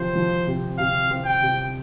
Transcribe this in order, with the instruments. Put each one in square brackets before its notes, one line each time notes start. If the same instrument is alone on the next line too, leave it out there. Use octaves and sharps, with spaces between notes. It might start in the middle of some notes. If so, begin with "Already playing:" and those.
Already playing: [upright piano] C3 F3 [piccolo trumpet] C5
[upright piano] F3
C3
[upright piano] C3 [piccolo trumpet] F5
[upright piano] C4
[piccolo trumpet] G5
[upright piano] C3